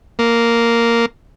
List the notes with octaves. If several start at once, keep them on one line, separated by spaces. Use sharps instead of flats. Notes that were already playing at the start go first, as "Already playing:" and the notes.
A#3